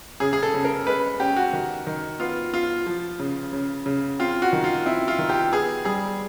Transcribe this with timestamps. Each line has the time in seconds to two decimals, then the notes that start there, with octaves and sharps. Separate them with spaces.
0.20 C#3 G#4
0.33 G#4
0.43 A4
0.54 C#3
0.65 A#4
0.87 G#3 B4
1.20 C#4 G4
1.36 F#4
1.53 D#3
1.87 D#3
2.20 B3 F4
2.53 B3 F4
2.86 F3
3.20 C#3
3.53 C#3
3.86 C#3
4.19 C4 F4
4.42 F#4
4.53 D#3
4.64 F4
4.86 C4 E4
5.08 F4
5.18 D#3
5.29 G4
5.52 B3 G#4
5.85 G3 G#4